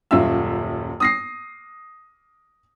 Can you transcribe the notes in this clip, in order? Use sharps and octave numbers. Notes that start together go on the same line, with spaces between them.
D#1 F#2 F4 E5 E6
D#6 A#6 C7